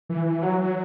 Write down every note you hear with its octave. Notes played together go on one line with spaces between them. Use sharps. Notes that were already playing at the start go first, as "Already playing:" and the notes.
E3
E3
F#3
F#3